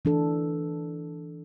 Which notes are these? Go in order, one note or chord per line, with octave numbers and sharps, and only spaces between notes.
E3 D4 A4